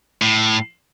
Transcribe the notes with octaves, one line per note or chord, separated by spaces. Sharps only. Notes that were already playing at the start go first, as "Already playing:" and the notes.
A2